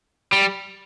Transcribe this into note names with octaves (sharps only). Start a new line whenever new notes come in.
G3